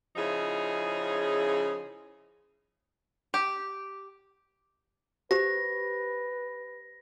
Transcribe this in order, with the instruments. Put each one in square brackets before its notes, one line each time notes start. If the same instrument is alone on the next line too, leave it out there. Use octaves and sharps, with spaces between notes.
[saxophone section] C#3 F3 C#4 D#4 E4 G#4
[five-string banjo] G4
[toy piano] G4 C5 [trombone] B4 [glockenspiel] A#6